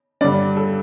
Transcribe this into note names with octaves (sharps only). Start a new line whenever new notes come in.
G2 D3 G3 D5
A4